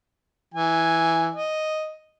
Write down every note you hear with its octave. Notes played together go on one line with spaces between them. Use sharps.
E3 G#5
D#5